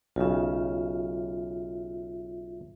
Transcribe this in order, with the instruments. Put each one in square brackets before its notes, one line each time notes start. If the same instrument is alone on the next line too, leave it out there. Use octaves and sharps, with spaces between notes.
[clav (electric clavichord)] B1 C#3 [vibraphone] F4 E5